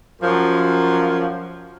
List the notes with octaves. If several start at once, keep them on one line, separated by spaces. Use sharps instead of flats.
F#2 F3